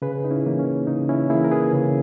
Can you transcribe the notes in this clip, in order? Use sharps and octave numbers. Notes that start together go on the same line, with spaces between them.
C#3 G#4 B4
D#4
C#4 E4
E3 A#3
C#4
C#3 D#4
C#4 E4
E3 A#3 E4 G#4
A#4
G#4 B4
C#3